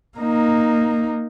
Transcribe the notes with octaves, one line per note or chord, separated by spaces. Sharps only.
A#3 D#4